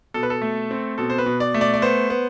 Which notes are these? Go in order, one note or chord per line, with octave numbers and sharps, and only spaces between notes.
B2 A4
B4
A4
A3
C4
B2 A4
C5
B4
B2
D5
A3
D5
D5
B3 C5
B3